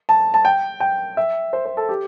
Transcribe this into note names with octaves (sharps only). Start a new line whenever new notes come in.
A5
A5
G5
G5
E5
C5
C5
A4
G4